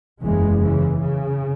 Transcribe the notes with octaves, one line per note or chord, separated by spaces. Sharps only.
F#1 E2 C#3 E3 G#3
C#3 E3
C#3